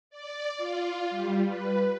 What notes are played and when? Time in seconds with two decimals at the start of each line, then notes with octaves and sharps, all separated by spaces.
0.10 D5
0.58 F4
1.10 G3
1.46 B4